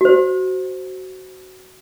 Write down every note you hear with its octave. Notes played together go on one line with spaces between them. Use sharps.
F#4 C5